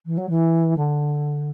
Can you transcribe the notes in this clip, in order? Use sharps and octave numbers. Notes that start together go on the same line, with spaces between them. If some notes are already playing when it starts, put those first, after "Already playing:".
E3
F#3
E3
D3